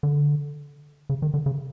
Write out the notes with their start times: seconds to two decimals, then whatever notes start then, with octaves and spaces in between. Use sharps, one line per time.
0.03 D3
1.10 C#3
1.22 D#3
1.34 D3
1.46 C#3